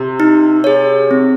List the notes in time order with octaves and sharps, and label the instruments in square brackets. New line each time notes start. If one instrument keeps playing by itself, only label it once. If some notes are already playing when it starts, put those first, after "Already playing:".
Already playing: [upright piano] C3
[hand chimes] D#4
G#4 C#5
C4